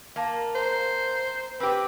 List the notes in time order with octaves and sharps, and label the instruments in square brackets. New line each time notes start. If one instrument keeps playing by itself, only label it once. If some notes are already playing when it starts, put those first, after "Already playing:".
[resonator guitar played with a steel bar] A#3 [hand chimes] F5 A5
[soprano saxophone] C5 [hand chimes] A#5
[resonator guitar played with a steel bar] C4 G4 [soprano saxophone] B4